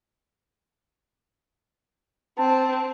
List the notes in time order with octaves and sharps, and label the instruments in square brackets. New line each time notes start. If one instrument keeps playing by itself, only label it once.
[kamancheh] C4 [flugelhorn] A5